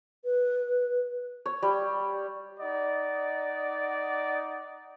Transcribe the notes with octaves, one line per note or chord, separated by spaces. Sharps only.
B4
C#5
G3
D#4 D5 D#5 F#5